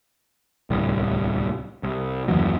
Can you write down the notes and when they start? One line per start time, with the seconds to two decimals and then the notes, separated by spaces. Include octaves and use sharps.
0.70 D1 C2 G3
1.83 C2
2.28 F#1 D#2 E3 F#3